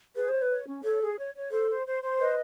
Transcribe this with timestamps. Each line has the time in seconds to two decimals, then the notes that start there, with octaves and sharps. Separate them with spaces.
0.16 G#4 B4
0.29 C5 C#5
0.42 B4
0.50 C#5
0.67 C#4
0.84 A4 C#5
1.01 G#4
1.18 C#5
1.36 C#5
1.51 A4 C5
1.70 C5
1.86 C5
2.03 C5
2.19 B4 D#5